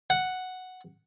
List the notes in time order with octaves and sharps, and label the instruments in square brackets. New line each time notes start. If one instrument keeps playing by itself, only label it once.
[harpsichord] F#5